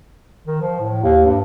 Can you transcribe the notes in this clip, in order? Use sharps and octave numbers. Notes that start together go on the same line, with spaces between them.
D#3
F3
A2
D#2
G2